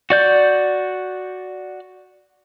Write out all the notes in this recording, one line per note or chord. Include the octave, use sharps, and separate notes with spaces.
F#4 D5 G6